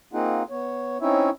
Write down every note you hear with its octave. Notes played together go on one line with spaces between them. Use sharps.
A#3 C4 D#4 F4 G#4 F#5
B3 C#5
C4 C#4 D#4 E4 C#5 E5